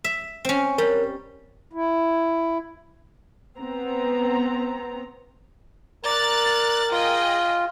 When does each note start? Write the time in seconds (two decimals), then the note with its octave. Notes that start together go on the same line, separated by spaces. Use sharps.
0.04 E5
0.45 C4 C#4
0.78 G3 A#4 C#5
1.73 E4
3.58 B3 C4 A#5
6.05 A#4 D5 A#5 F#6 A6
6.92 F4 G#4 D#5 G5